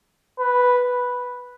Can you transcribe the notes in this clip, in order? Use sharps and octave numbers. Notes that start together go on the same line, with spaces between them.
B4